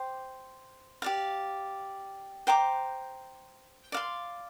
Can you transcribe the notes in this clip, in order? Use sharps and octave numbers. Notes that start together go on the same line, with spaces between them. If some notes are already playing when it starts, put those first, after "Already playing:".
Already playing: C5 G5 D6
G4 D5 F5
C5 G5 A#5 D6
D5 F5 C6